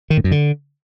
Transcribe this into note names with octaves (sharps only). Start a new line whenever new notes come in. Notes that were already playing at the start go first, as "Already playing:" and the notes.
D#3
A2
F#2
D3